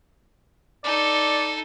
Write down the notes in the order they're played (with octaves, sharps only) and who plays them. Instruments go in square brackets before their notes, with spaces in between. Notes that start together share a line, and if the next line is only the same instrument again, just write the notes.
[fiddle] D#4 A4 [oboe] D5